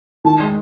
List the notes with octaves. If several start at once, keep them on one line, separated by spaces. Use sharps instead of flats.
D#3 A5
G#3